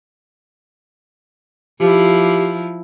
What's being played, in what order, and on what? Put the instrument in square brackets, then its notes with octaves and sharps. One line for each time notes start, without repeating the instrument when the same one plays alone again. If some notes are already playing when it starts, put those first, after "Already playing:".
[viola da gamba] F3 E4 [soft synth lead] G4